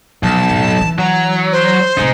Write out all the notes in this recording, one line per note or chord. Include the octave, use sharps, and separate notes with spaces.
B1 F3 A5
F2 A2
E3
F#3 A#5
C5
A2 C3 G#3 D#4